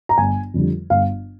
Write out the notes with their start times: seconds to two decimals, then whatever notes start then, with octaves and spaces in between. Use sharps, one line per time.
0.09 A#5
0.18 G1 G#5
0.54 F2 D3 G3
0.90 G1 F5